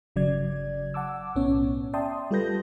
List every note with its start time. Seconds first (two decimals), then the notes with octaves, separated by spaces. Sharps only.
0.16 G1 C#3 F#3 D5 G#6
0.94 F#5 A5 D6 E6
1.35 B1 A2 B3 C#4 C#5
1.93 D5 E5 G5 A5 C6 D#6
2.31 G3 F4 A4 B4 G6 A#6